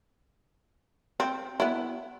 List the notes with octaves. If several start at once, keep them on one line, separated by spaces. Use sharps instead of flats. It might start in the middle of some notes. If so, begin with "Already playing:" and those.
C4
B3 E4